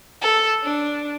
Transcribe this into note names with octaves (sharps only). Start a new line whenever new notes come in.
A4
D4